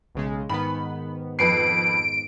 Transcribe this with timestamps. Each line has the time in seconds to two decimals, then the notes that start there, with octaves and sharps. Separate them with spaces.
0.15 B1 C#3 G#3
0.50 G#2 D#3 B3 B5
1.39 F2 B4 C7 D7